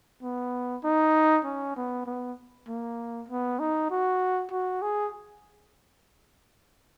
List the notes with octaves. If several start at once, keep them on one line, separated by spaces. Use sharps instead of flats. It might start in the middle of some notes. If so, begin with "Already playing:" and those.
B3
D#4
C#4
B3
B3
A#3
B3
D#4
F#4
F#4
G#4